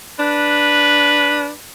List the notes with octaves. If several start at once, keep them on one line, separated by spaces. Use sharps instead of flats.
D4 B4